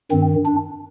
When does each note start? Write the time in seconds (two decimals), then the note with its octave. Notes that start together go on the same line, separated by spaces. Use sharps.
0.11 G2 D#3 C4
0.46 D4